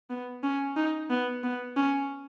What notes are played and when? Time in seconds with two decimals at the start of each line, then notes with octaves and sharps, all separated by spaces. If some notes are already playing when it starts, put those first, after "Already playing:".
0.10 B3
0.43 C#4
0.77 D#4
1.10 B3
1.44 B3
1.77 C#4